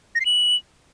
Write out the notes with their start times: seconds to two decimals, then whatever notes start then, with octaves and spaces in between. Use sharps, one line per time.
0.15 A#6
0.20 C7
0.26 F#7